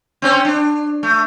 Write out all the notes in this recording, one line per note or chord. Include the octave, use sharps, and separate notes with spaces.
C4 C#4 C5
D4
A3